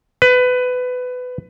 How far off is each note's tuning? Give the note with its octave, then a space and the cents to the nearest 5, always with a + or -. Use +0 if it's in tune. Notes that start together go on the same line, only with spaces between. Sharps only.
B4 +20